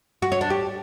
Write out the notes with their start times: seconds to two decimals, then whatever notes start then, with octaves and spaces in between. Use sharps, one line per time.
0.22 F#4
0.32 C#5
0.41 D4
0.50 G4